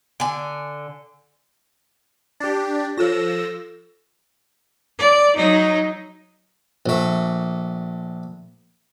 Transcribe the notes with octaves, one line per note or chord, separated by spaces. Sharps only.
D3 G#5
D4 G4 A6
F3 F4 A4 E6 A#6
D5
F#3 D#4
A#1 A3